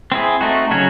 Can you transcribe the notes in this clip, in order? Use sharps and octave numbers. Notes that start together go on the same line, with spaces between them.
C4 E4 G#4
A3 C4 D#4 F#4
C#3 F#3 C#4 F#4 C#5